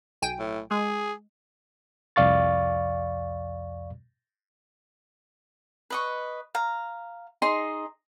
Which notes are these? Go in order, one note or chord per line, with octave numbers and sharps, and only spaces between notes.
B1 G5 G#5
A2
G#3 G#4
C2 F2 D5 F5 C#6 A6
B4 D#5 C#6
F5 A#5
D#4 G#4 D#5 C6